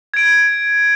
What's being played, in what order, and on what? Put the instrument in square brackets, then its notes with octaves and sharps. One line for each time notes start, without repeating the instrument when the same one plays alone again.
[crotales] G#6 D7